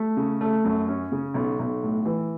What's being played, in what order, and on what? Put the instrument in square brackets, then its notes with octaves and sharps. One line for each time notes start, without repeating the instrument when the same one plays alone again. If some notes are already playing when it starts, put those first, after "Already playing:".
Already playing: [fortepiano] A3
C#3
A3
F#2
C#4
C#3
B1
B1
A2
E3